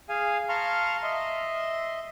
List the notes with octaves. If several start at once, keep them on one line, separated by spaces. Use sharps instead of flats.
G#4 F5 G#5
F5 A5 A#5 C6 C#6 F6
D#5 E5 C6